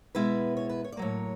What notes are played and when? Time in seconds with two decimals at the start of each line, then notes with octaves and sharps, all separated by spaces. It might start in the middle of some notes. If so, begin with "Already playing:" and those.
0.15 B2 G#3 B3 E4 B4
0.57 C#5
0.69 B4
0.84 C#5
0.92 D5
0.97 A2 F#3 A#3 C#5